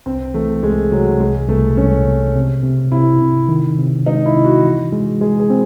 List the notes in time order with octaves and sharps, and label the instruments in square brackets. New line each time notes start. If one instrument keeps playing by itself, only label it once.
[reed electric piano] C2 [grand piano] C4
[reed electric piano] E3 [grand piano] A3
[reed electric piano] C2 [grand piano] G#3
[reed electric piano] C3 [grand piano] F#3
[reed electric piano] C2 [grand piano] G#3
[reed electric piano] C2 [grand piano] A3
[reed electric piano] C2 [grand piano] C#4
[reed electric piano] C3
C3
C3
[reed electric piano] C3 [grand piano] E4
[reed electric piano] C3
D#3
C3
[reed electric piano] G#3 [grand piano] D#4
[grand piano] E4
[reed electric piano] C3
[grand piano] F#4
[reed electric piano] E3
G#3
[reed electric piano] G#3 [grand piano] G#4
[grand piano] G#4
[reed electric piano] C4